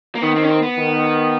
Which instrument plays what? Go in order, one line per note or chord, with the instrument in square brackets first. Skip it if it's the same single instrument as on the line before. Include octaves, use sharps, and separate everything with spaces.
[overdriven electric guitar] A#3
[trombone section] D#3 [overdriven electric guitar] B3
[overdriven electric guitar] C4
C#4
C4
B3
[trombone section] D#3